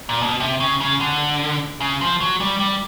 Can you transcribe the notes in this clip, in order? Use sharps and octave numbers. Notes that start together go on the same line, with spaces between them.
A#2
B2
C3
C#3
C#3
D3
C#3
F3
F#3
G3
G3